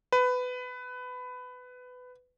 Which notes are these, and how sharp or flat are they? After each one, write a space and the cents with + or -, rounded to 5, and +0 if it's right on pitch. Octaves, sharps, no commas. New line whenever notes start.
B4 +20